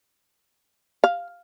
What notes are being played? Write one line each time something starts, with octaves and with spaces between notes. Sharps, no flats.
F5